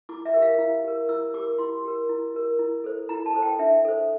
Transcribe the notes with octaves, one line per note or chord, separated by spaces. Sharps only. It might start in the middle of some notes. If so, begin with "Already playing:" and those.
E4 D6
E5
G4 A#4
F5
E4
G4 A#4
E4 E6
G4 A#4 D6
E4 C6
G4 A#4
E4
G4 A#4
E4
A4 C5
E4 A#5
A5
A4 C5
G5
D4 E5
A4 C5